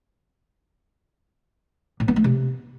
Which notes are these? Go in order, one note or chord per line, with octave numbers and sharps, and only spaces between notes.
A2
B3
A3
C3